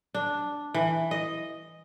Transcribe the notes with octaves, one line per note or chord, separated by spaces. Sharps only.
D4
E3
D#5